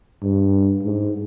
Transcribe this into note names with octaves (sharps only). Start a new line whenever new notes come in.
G2
G#2